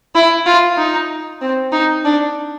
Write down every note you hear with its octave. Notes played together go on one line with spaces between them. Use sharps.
E4
F4
D#4
C4
D#4
D4